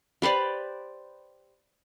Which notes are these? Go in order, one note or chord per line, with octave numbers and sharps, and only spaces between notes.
G4 B4 C5 D5